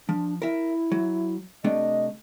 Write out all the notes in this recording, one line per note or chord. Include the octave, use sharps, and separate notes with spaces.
F3 D4
E4 A#4 E5
F#3
C3 A3 D4 D#5